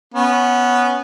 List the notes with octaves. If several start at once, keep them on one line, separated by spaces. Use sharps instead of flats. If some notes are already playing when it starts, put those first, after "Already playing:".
B3 C#4